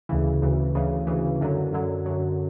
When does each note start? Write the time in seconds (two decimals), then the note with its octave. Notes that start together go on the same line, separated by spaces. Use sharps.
0.09 D2 C#3 E3
0.42 D2 C#3 E3
0.75 D2 C#3 E3
1.07 D2 C#3 E3
1.41 F#2 D3 F#3
1.73 F#2 D3 F#3
2.06 F#2 D3 F#3